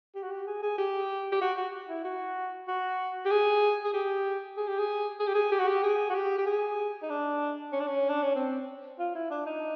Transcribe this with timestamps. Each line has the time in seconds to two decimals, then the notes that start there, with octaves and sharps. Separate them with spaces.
0.15 G4
0.23 F#4
0.31 G4
0.47 G#4
0.63 G#4
0.78 G4
1.32 G4
1.41 F#4
1.57 F#4
1.89 E4
2.05 F#4
2.68 F#4
3.25 G4
3.31 G#4
3.84 G#4
3.94 G4
4.57 G#4
4.68 G4
4.79 G#4
5.20 G#4
5.27 G4
5.35 G#4
5.52 G4
5.60 F#4
5.68 G4
5.83 G#4
6.10 F#4
6.15 G4
6.38 G4
6.46 G#4
7.03 D#4
7.09 D4
7.73 C#4
7.80 D4
7.87 C#4
8.09 D4
8.23 C#4
8.36 C4
8.99 F4
9.15 E4
9.31 D4
9.46 D#4